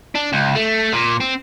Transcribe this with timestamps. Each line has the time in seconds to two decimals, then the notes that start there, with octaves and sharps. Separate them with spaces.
0.15 D4
0.33 C#2
0.56 A3
0.93 A#2
1.20 C4